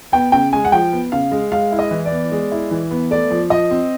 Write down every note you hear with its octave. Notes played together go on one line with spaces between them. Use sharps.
B3 G5
C#3 G5
G#3 G#5
F#5
F3 G5
B3
C#3 F5
G#3
G#3 F5
E4
D#5
E3
D5
B3
G#3
E4
E3
B3
A3 D5
F3
F3 D#5
C4